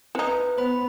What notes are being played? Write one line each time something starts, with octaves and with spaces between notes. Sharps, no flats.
C4 D#4 E4 B4
B3 C5 B5